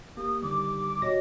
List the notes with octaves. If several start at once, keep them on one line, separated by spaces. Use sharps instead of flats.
A#3 G4 D#6
D3 D#3 G3 D6
B2 F#4 G4 C#5 D#5 A#6